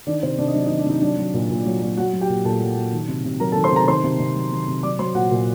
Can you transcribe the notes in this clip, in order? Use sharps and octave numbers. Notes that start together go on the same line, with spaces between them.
D#3 D4 D5
C3 C5
C3 D4 D5
D#5
F#3 D4 D5
D#4 D#5
D#3
D4 D5
C3 D#4 D#5
F#3 D4 D5
F#3
A#2
A#2
F#3
F#3
F#3 F#4 F#5
F#3
G4 G5
A#2
A#2 A4 A5
F#3
F#3
D#3
C3
C3
F#3 A#4 A#5
A4 A5
D#3
C5 C6
C3 A#4 A#5
D#3 C5 C6
C3
C3
F#3
D#3
C3
F#3 D5 D6
F#3 C5 C6
A#2 F#4 F#5
A#2